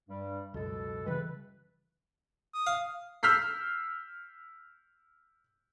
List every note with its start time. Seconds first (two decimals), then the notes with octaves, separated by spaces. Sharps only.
0.08 G2 G3
0.54 C#2 F#2 B2 A4
1.06 C#3 E3 G3 B4
2.54 D#6
2.67 F5
3.23 E6 F6 G6 B6 C7